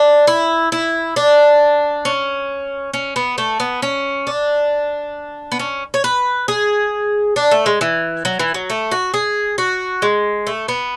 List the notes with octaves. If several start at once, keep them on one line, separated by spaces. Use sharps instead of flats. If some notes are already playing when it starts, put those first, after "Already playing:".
Already playing: D4
E4
E4
D4
C#4
C#4
B3
A3
B3
C#4
D4
B3
C#4
C#5
B4
G#4
D4
A3
G#3
E3
F#3
E3
F#3
A3
F#4
G#4
F#4
G#3
A3
B3